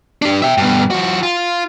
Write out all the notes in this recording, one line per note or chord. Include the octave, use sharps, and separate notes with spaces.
D4 G4
E5 G5
G2 B2
F3 F#4
F4